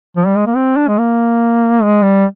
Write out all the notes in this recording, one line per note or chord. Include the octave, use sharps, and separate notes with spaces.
F3
G3
G#3
A#3
C4
D4
G#3
A#3
G#3
G3